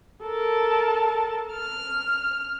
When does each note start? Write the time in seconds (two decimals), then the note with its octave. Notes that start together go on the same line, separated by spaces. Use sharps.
0.24 A4 A#4 A5
1.53 F6